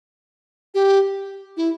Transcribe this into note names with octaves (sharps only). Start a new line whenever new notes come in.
G4
E4